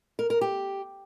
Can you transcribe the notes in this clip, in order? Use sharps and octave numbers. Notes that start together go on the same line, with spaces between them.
A#4
A#4
G4